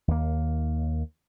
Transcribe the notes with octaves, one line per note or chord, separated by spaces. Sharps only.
D#2 A#3